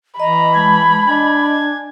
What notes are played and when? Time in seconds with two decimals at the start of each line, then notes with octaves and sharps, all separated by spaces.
0.20 E3 D#5 A#5 B5
0.54 G#3 A5 G#6
1.07 D4 D#5 G#5 G#6